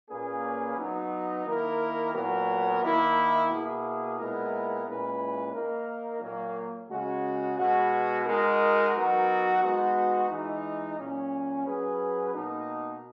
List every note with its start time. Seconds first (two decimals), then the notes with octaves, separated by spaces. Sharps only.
0.09 A#2 A#3 C#4 G#4 B4
0.77 F#3 B3 D#4
1.45 D#3 A#3 E4 A#4
2.13 A#2 F#3 B3 F#4 A#4
2.82 D#3 A#3 E4
3.49 B2 A#3 E4 G#4
4.18 A#2 G#3 B3 E4 A#4
4.86 A#2 G#3 C#4 E4 B4
5.54 A#3 D#4 A#4
6.21 A#2 F#3 A#3
6.89 C#3 G#3 C#4 F#4
7.58 B2 G#3 B3 F#4
8.25 G#3 D#4 F#4 A#4
8.94 F#3 B3 D#4 F#4 A#4
9.62 G#3 B3 D#4 F#4
10.29 E3 G#3 D#4
10.98 A#2 F#3 C#4
11.66 F#3 C#4 G#4 B4
12.34 B2 A#3 D#4